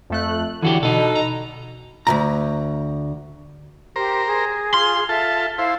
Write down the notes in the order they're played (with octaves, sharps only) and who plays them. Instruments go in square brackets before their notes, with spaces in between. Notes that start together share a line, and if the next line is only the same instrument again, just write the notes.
[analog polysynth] F2 A3 F#6
[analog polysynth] D3 [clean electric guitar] E3 F#4 G4
[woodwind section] B2 [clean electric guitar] D#4 A4
[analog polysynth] A#5
[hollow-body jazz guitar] D2 G#2 A#5
[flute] G4 [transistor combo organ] A#4 C5 A#5
[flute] G#4
[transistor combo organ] F4 [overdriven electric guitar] C6
[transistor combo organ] F4 A4 A5 [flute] E5
[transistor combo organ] E4 C5 [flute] F5